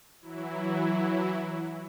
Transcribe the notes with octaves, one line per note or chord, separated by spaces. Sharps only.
E3 F#3 E4